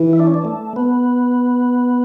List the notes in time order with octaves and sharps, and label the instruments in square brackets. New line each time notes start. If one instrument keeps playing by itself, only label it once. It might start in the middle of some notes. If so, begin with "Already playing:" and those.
Already playing: [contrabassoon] E3
[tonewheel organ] E4
D4
C#4
D4
A3
B3